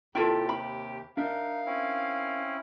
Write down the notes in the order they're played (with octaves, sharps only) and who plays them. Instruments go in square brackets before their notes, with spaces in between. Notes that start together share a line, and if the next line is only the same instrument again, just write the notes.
[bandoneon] D#2 C3 G4 [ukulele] E4 F4 A4 [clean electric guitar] G5
[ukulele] B5
[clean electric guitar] D4 A#4 E5 [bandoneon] D#4 [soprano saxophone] F5
[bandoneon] C4 C#4 E4